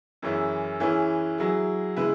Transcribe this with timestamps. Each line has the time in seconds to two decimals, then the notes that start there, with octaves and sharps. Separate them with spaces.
0.22 F#2 E3 C#4 E4 G#4
0.80 E3 C#4 E4 G#4 B4
1.38 F#3 E4 G#4
1.97 C#3 G#3 E4 B4